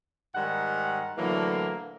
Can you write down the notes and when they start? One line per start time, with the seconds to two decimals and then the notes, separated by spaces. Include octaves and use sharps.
0.35 G#2 D#3 G3 F#5
1.18 A2 D3 E3 F#3 A#3